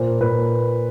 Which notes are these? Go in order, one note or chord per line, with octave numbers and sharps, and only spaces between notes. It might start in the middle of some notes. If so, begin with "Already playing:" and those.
Already playing: A#2 C5
A#2 B4